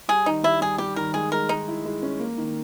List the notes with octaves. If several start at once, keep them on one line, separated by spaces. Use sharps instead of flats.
G3 G#4
D#3 D#4
G3 E4
G3 G#4
G3 G4
D#3 A#4
G#3 G#4
G#3 A#4
G#3 D#4
E4
G#3
C#4
A#3
D#3